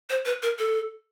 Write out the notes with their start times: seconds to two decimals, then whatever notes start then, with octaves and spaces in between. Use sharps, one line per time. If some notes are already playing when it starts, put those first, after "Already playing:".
0.10 C5
0.25 B4
0.43 A#4
0.59 A4